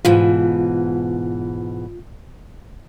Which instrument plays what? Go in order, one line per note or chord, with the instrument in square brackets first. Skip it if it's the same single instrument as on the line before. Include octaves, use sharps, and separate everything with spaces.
[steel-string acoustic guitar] G#2 B2 E3 [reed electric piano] F4